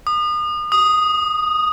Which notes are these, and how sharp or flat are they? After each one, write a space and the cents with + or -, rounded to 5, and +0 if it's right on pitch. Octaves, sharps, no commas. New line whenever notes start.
D#6 -35
D#6 +0